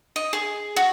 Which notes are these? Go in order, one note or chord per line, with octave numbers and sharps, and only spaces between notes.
D#5
G#4
F#4